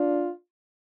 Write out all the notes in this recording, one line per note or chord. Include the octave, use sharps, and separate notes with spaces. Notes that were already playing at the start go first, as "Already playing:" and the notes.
Already playing: D4 F4